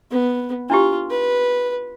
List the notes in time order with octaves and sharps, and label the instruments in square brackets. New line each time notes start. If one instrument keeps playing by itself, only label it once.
[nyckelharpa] B3
[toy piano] D4 E4 G4 [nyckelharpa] F4
[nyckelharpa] B4